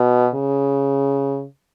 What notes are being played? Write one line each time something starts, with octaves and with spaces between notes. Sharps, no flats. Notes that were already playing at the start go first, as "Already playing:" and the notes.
Already playing: B2
C#3